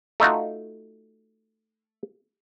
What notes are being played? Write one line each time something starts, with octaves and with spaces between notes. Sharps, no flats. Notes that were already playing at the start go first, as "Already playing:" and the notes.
A3 D#4 F4 F#4